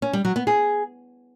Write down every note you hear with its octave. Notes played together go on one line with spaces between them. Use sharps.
C#4
G3
F#3
B3
G#4